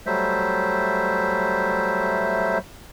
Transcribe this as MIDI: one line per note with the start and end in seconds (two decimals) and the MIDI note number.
0.06 2.58 54
0.06 2.58 55
0.06 2.58 57
0.06 2.58 72
0.06 2.58 76